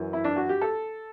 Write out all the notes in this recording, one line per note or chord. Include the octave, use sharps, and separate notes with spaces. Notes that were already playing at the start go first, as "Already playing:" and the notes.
Already playing: F#2 E3
E4
D4
F#4
G4
A4